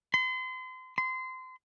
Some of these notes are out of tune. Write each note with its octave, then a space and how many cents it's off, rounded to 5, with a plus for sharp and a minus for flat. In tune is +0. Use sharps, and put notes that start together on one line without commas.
C6 -35
C6 -25